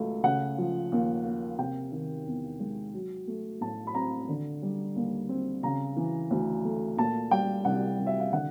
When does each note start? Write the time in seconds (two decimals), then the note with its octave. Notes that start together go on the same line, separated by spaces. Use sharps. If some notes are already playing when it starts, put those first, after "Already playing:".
Already playing: C#2 F#3 A3
0.24 C#3 F#5
0.58 F3
0.92 D#2
1.25 A#3
1.59 C3 G5
1.92 D#3
2.26 E2
2.60 G#3
2.94 F#3
3.28 A3
3.61 A2 A5
3.87 B5
3.94 C4 A#5
4.29 D3
4.63 G3
4.96 D#2
5.29 C4
5.63 C#3 A#5
5.97 E3
6.31 D2
6.65 A3
6.97 A#2 A5
7.31 G3 G5
7.65 C2 F#5
7.98 C2
8.06 E5
8.20 F5
8.32 D3 F#5